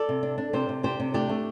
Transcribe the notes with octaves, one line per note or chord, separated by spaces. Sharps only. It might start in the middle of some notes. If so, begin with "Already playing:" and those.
Already playing: A4 D5
C3
D4
D4
C3 G4 C5
C3
D4 G4 C5
C3
A3 D4 G4
A3